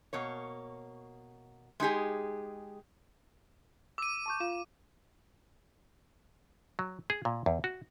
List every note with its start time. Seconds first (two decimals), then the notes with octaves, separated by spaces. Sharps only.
0.13 B2 A#3 C#5
1.80 G#3 D#4 G4 G#4
3.98 D6 E6 D#7
4.26 A5 C#6 G6
4.40 F4 F5 E7
6.79 F#3
7.10 G#4
7.25 A#2
7.46 E2
7.64 F#4